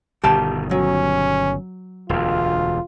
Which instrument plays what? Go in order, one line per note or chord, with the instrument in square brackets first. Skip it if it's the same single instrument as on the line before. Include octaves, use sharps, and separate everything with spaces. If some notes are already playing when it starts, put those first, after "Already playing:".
[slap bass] G1 B2 D#3 [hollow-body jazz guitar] G4 A5
[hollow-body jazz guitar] F#3 [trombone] C#4
[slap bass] E1 D2 [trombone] F4